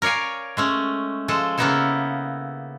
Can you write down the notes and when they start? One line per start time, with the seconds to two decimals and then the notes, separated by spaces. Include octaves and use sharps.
0.02 A#4 C#5 D5 F5 G#5
0.57 G#3 A3 C#4
1.28 F3 G#3 A4
1.58 C#3 A#3 B3 D#4 E4 A4